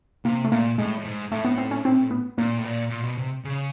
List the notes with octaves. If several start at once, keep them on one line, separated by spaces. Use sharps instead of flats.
C3 A#3
A3
A#2 A#3
A2 G#3
A2
G#2
A2 A3
B3
C4
C#4
C4
B3
A#2 A#3
A2
A#2
A#2
B2
C3
C#3